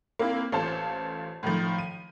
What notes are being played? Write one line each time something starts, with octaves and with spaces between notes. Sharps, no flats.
A#3 C4 E4
A1 F4 A4 C5 A5
A2 D#3 F3
D#7